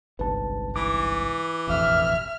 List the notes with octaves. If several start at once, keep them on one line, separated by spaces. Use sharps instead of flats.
G1 C2 G#2 B4 A5
E3 D6
E1 A1 F2 E5 F6